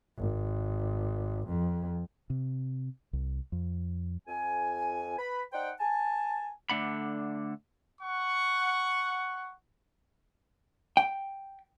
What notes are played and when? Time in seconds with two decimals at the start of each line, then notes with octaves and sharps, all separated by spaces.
0.18 G#1
1.48 F2
2.30 C3
3.13 C2
3.52 F2
4.28 F2 G#5
5.18 B4 B5
5.53 D#4 C5 D5 F#5 G5
5.79 G#5 A5
6.70 D3 A3 D4 F#5 B5
8.02 F#5 C#6
10.97 G5